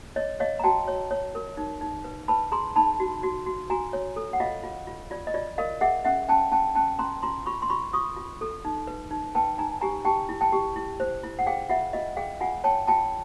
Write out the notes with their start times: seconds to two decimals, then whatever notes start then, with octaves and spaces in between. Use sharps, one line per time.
0.16 C#5 D#5
0.40 C#5 D#5 F5
0.59 A#5
0.63 F#4 G5 A5
0.88 C#5
1.11 C#5
1.35 A#4
1.57 D#4
1.81 D#4
2.04 B4
2.28 B4 A5 B5
2.52 G#4 A#5 C6
2.76 D#4 A5 B5
3.00 F#4
3.23 F#4
3.46 F#4
3.70 F#4 G#5 A#5
3.93 C#5
4.16 A4
4.33 F#5
4.40 F4 D#5 F5
4.64 F4
4.87 F4
5.11 F4 D5
5.27 D#5
5.34 F4 D5
5.58 A#4 D#5 F5
5.81 G#4 E5 F#5
6.05 C#4 E5 F#5
6.29 C#4 G5 A5
6.52 C#4 G5 A5
6.75 C#4 G5 A5
6.99 C#4 A#5 C6
7.22 F4 A#5 C6
7.46 F4 B5 C#6
7.62 C6
7.70 F4 B5 C#6
7.93 F4 C#6 D#6
8.16 F4
8.41 A4
8.65 D#4
8.87 B4
9.11 D#4
9.35 B4 G5 A5
9.58 D#4 G#5 A#5
9.81 G4 G#5 A#5
10.05 G4 G5 A5
10.29 E4
10.41 G5 A5
10.53 G4
10.76 E4
11.00 C5
11.24 E4
11.39 F#5
11.46 G#4 F5 G5
11.69 F4 E5 F#5
11.93 F4 D#5 F5
12.17 G#4 F5 G5
12.41 F4 F#5 G#5
12.64 C#5 G5 A5
12.87 F4 G5 A5